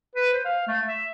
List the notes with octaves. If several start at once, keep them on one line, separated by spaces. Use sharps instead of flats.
B4
C5
F5
A3
E5